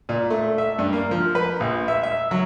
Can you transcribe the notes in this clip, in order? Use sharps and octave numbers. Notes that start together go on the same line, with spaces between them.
A#2
A3
E5
G2
A#3
F3
B4
A#1
E5
E5
F#3